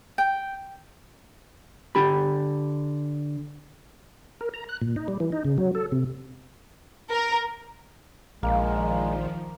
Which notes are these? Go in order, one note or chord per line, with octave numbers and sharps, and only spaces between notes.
G5
D3 G4 B5
A#4
A#5
F#6
A#2
D#4
G3
E3
D#4
C#3
F#3
A4
C3
A#4
A#1 D#3 F3 G#3 A#3